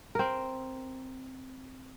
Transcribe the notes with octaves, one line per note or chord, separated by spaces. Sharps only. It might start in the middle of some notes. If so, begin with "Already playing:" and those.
C4 A#4